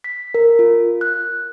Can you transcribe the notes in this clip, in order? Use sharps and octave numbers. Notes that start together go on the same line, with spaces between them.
B6
A#4
F4
F#6